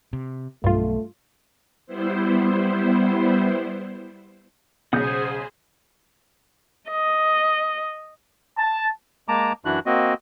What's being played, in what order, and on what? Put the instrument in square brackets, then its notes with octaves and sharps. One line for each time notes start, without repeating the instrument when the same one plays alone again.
[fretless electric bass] C3
[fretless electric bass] B1 [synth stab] G2 F4 [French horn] A3
[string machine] G3 B3 E4 C5
[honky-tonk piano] B1 C#3 [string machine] G#4 C5 G#5 [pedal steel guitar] F#5 D#6 G6
[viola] D#5
[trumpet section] A5
[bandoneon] G#3 A#3 A5 A#5 D6
F#2 E3 D4 E4 F#4 F#6
A#3 C4 F#4 D#5